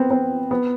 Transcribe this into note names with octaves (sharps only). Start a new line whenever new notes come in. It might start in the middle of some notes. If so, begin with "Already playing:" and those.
Already playing: B3 C4
C4
B3